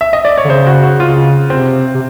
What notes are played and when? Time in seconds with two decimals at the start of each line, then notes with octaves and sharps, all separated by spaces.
0.01 E5
0.13 D#5
0.25 D5
0.38 C#5
0.45 D3
0.50 C#3 C5
0.67 F#4
0.83 F#4
1.00 C#3 F4
1.50 C3 C4
1.95 C3